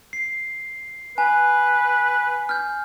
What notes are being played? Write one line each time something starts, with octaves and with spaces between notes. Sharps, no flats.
C7
B4 G#5
F6 G6